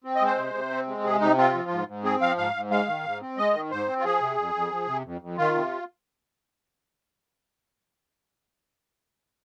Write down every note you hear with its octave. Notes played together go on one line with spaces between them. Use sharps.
C4
D#5
G#3
C5
C3
C3
C4
G#3
C3 G#4
C3 D#4
C4 F4
F3
G#2
G#2
C4 G#4
F3 F5
G#2 F5
G#2
G#3 F5
D#3
G#2
C4
G#3 D#5
D#3
G#2 C5
C4
F4
F3 G#4
C3
F2
F2
F3
C3
F2
F2
D#3 F4
C3